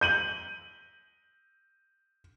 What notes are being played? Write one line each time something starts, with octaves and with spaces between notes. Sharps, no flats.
G6 D#7 F#7